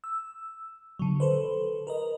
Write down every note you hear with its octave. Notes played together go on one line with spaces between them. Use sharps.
E6
D3 F#3
A4 B4 C5
A#4 B4 D#5